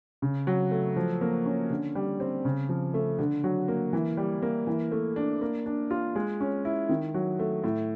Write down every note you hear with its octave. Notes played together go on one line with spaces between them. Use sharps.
C#3
F#3
A3
F3
A#3
C#4
D3
G3
C4
C#3
F3
A3
D3
F#3
A#3
E3
G3
A#3
E3
A3
D4
A#3
D4
F4
G#3
C#4
E4
D#3
F#3
A3
A2